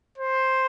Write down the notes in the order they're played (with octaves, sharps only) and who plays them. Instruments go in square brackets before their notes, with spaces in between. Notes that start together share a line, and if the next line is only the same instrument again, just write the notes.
[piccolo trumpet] C5